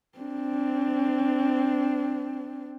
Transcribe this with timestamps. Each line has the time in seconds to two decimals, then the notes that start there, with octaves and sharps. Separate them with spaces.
0.18 C4 D4